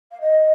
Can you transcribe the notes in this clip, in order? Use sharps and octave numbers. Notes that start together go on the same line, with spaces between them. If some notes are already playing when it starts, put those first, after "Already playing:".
F5
D#5